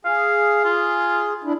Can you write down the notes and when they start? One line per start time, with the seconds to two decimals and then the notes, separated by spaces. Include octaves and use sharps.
0.05 G#4 F5
0.65 F4
1.44 D4 E4